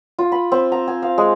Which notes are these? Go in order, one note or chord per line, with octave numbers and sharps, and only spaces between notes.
F4
B5
C4
A#5
G#5
F5
G#3